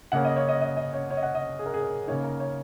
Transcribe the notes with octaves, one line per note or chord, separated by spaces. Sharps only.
C#3 A#3 C#4 F#5
D#5
C#5
D#5
D#5
D#5
C#5
C#5
D#5
F#5
D#5
G#4
A#4
G#4
A#4
C#3 A#3 D#4 C#5
A#4
C#5